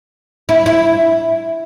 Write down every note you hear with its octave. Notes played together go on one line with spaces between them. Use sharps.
E4
E4